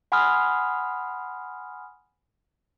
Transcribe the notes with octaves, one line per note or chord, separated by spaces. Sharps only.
F#5 G#5 B5 C6 D#6 F6